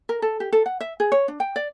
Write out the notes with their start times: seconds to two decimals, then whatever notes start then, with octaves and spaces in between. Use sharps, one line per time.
0.09 A#4
0.22 A4
0.40 G4
0.52 A4
0.66 F#5
0.80 E5
1.00 G#4
1.12 C#5
1.28 D4
1.40 G5
1.56 D5